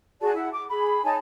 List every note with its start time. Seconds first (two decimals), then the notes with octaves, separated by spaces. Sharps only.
0.21 F#4 G#4 D5 A5
0.34 E4 F#5
0.52 D6
0.68 G#4 B5
1.04 D#4 C#5 G#5 A5